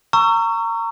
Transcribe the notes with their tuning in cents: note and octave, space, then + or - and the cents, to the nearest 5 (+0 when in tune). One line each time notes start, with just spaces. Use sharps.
A#5 -20 C#6 +10 E6 +35